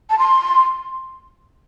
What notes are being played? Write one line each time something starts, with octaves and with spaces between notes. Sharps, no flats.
A5
C6